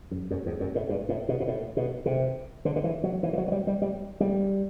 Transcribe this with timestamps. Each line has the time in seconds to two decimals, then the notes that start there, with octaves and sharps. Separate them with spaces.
0.11 F#2
0.31 F#2
0.46 E2
0.60 F#2
0.75 A2
0.89 G2
1.09 A2
1.29 B2
1.40 B2
1.47 A2
1.77 B2
2.06 C3
2.65 D3
2.76 D3
2.84 E3
3.04 F#3
3.23 E3
3.33 E3
3.38 F#3
3.48 F#3
3.52 G3
3.67 G3
3.82 G3
4.20 G3